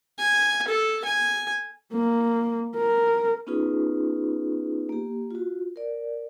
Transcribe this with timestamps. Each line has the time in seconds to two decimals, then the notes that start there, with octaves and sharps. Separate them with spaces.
0.19 G#5
0.68 A4
1.05 G#5
1.93 A#3
2.76 A#4
3.47 B3 C#4 D#4 F4 G#4 B4
4.89 A#3 G4
5.31 F4 F#4
5.76 A#4 D5